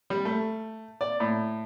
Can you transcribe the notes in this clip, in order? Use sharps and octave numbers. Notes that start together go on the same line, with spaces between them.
G3
A3
D5
A2